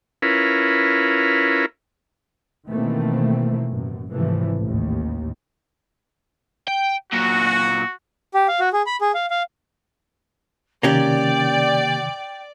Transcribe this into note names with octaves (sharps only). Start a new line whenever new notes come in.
C#4 E4 F4 A#4 B4
B2 D#3 E3 A3 A#3 C4
A1 F#2 A2
G#1 C3 E3 F3 A3
A1 D#2
G5
A#2 F#3 F#4
G4
F5
F#4
G#4
B5
G#4
F5
F5
C3 D#3 A#3 C#4 G4 D5 G5